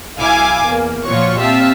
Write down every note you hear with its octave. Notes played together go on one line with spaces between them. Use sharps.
B1 E4 F5 G#5 D6
E2 A#3
A#2 F3 F4 F#4 C#5 C#6
C4 G4 E5 F5 A5